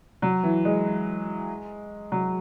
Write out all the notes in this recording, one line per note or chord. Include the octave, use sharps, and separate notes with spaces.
F#3
E3
G#3
F#3